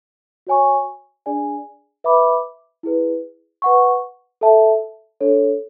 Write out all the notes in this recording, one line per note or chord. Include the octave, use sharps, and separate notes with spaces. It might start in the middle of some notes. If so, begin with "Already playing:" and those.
F#4 C#5 G#5 C#6
D4 G#4 D5 G#5
B4 E5 B5 D6
E4 G#4 B4
B4 F#5 C#6
A4 E5 A5
D4 A4 C#5